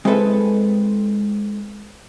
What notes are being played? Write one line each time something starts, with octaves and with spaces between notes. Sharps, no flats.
G#3 C4 E4 A4 B4 E5